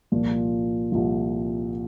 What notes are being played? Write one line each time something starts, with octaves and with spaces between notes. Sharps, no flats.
C2 A#2 F3
C2 A#2 F3